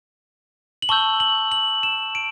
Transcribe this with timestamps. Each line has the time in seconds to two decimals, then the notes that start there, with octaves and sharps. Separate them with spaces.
0.82 F#7
0.89 A5 C#6 E6 G6 G7
1.20 F#7
1.52 F#7
1.83 E7
2.15 D7